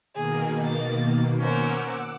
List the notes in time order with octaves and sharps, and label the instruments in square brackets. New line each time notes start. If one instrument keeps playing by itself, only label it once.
[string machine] B2 D#3 A#3 [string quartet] G#4
[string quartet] A6
[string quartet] C#4 A#4 C5 [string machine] F#5 D6 E6